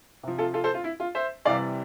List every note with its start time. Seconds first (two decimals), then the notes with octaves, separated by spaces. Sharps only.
0.23 C3 F3
0.38 F4 A4
0.54 F4 A4
0.64 A4 C5
0.74 F4
0.84 E4
1.00 F4
1.15 C5 E5
1.45 C3 E3 G3 D5 F5